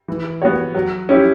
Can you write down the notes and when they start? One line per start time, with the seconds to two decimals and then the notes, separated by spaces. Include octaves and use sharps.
0.08 E3
0.42 B3 F#4 C#5
0.74 F#3
1.09 C#4 E4 G4